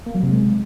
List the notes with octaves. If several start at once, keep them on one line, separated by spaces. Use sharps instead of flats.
A#3
F#3
C3
G#3